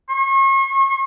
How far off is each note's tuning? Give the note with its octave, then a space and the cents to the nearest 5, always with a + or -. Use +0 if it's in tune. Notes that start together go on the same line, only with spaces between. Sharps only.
C#6 -40